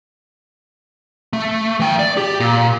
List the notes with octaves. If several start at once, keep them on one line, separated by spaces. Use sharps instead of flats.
A3
E3 G5
D5
G4
A#2